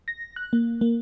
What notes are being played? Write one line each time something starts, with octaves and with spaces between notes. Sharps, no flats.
A#6
F#6
A#3
A#3